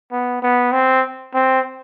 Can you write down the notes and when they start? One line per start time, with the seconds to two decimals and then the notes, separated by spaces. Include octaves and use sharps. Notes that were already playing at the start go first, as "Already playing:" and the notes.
0.12 B3
0.42 B3
0.72 C4
1.34 C4